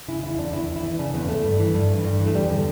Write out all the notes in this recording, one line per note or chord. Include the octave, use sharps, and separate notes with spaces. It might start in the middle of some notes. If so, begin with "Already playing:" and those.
C#3 E4
E2 E4
E2 D4
E2 E4
E2
E4
E3
C#3 D4
E2 B3
E2 A3
G2
E3
G2
E3
G2
E3
A3
E2 G3
D3